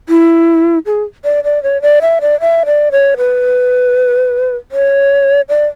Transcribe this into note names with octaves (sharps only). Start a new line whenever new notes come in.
E4
G#4
D5
D5
C#5
D5
E5
D5
E5
D5
C#5
B4
C#5
D5